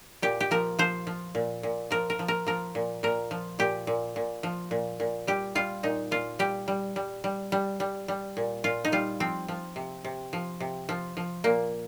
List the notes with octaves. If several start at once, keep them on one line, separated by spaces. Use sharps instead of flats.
A#2 G4
G4
F3 A#4
F3 C5
F3
A#2
A#2
F3 A#4
A#4
F3
A#4
F3 A#4
A#2
A#2 A#4
F3
A#2 G4
A#2
A#2
F3
A#2
A#2
G3 G4
G3 F4
A#2 D#4
A#2 F4
G3 G4
G3
G3
G3
G3
G3
G3
A#2
A#2 F4
D#4
G3 F4
F3 C4
F3
C3
C3
F3
C3
F3
F3
A#2 A#3